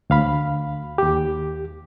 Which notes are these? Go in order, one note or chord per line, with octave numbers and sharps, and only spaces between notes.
D2 F5 B5
D#2 G4